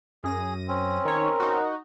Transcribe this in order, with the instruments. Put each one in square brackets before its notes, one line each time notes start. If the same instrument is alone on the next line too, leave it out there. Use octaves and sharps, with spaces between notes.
[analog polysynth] F#2 A#6 D#7 [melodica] G#4
[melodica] C4 C#4
[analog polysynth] D#3 C#5 [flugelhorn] A#4
[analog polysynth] D#4 F#4